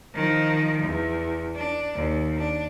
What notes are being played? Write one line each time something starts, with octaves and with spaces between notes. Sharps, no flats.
D#3 F3
E2
D4
D#2
D4